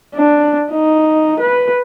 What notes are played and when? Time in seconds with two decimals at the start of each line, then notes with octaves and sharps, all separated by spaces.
0.15 D4
0.72 D#4
1.39 B4